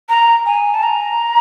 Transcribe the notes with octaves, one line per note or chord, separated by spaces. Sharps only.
A#5
G#5
A5
A#5